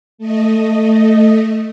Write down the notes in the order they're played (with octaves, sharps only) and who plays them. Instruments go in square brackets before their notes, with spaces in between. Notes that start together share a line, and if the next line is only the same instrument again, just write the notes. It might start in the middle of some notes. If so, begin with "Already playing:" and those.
[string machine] A3 D#5